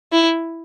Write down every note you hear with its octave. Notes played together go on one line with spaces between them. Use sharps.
E4